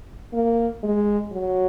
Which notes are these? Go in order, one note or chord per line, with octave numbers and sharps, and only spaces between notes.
A#3
G#3
F#3